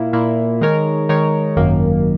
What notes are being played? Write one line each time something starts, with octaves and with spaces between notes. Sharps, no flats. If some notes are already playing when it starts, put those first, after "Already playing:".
Already playing: A#2 A#3 E4
A#2 A#3 E4
D#3 G#3 D#4 A#4 C#5
D#3 G#3 D#4 A#4 C#5
G#1 F#2 D#3 A#3